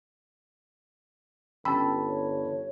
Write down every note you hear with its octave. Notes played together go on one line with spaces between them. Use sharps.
G1 C#4 G5 A5 B5 E6
C#5